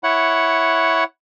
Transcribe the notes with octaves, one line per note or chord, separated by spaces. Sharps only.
E4 C#5 F#5